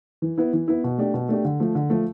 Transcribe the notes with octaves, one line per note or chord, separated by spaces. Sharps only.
E3
B3 E4
E3
B3 E4
B2
A3 D4 G4
B2
A3 D4 G4
D3
F3 A3
D3
F3 A3